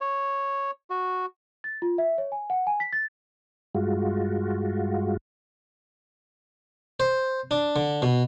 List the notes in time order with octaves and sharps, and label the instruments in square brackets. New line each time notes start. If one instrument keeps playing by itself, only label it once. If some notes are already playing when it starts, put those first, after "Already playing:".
[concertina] C#5
F#4
[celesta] A6
F4
E5
C#5
G#5
F#5
G#5
B6
A6
[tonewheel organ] G2 G#3 F4 F#4
[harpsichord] C5
D4
D3
B2